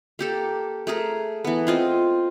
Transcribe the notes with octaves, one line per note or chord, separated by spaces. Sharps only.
A#3 G4 A4
A3 G#4 A#4
E3 B3
C4 F4 D#5